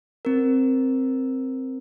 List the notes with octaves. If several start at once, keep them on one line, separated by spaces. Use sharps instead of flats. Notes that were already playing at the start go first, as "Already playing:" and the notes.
C4 A#4